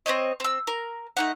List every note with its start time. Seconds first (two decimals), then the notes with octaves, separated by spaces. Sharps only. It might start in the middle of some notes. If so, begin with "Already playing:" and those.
0.06 C4 C5 C#5 D#5
0.40 C4 E6
0.67 A#4
1.17 A3 D#4 F#5